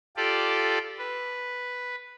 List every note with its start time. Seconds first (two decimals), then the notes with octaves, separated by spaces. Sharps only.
0.17 F4 G4 A4 D5
0.98 B4